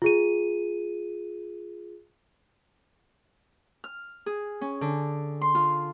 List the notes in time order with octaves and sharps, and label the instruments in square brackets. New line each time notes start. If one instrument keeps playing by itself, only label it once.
[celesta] F4 G#4 D#7
[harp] F6
G#4
C#4
D3
C6
F4